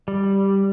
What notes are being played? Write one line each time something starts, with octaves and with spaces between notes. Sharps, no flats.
G3